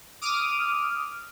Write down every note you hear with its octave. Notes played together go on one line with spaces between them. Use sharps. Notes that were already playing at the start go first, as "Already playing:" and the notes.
D6 D#6 F6